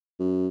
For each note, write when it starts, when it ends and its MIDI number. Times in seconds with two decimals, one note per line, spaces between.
0.19 0.48 42